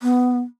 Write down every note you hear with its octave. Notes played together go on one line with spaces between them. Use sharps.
B3